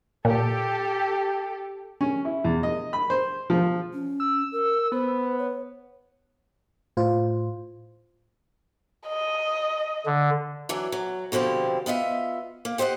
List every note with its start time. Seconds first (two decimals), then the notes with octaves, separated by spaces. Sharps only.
0.25 A#2 G4 A4
2.01 C#4
2.25 E4
2.44 E2
2.63 D#5
2.93 B5
3.10 C5
3.50 F3
3.94 C#4
4.20 E6
4.52 A#4
4.92 B3 C5
5.38 C#5
6.97 A2 F4 C5
9.08 D#5
10.06 D3
10.69 E3 F#3 D4
10.92 F#3
11.32 B2 D3 F3 C4 G4
11.86 B3 F4 D#5 E5
12.65 A#3
12.78 G4 C5 D#5 F5 F#5